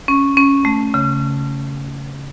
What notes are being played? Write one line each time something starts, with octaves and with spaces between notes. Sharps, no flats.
C#4
C#4
A3
C#3